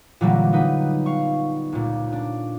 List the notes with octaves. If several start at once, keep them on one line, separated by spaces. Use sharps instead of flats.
A#2 D3 E3 F#3 G3 A#3
B3 D#4 B4
F5 C#6
C#2 A#2
D4